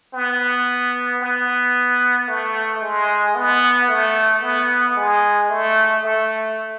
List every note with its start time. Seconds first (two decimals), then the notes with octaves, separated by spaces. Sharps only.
0.14 B3
1.21 B3
2.28 A3
2.81 G#3
3.35 B3
3.88 A3
4.42 B3
4.96 G#3
5.50 A3
6.03 A3